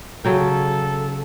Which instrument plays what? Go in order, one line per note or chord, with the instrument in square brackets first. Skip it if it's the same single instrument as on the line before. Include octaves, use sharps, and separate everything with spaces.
[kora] C#3 F#3 G5 [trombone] A4